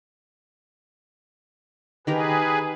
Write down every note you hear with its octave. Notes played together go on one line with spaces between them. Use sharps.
D#3 G4 G#4 A#4 B4